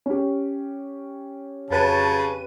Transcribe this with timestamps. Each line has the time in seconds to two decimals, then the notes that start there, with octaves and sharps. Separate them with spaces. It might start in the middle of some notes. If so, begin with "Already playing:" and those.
0.06 C#4 G4
1.70 F2 C#3 F#3 B4 C#5 A5 D#7